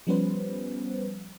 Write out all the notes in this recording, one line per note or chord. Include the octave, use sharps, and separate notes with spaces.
F3 G3 B3 C#4 B4 C5